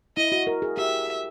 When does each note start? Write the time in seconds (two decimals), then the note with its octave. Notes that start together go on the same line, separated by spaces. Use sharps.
0.17 E4 D#5
0.32 F#4
0.47 A#4
0.62 G#4
0.77 G4 E5